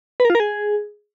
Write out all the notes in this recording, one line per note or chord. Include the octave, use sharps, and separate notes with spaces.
B4
A#4
F4
A#4
G#4